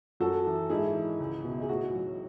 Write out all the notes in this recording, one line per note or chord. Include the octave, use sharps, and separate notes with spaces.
F#2 F#4 A4
E3
G#2 E4 G#4
E3
C#2
B2
G#4
A2 F#4
F#3